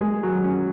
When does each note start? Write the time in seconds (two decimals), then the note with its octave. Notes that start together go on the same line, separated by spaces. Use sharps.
0.01 G#3 G#4
0.23 F#3
0.44 C#4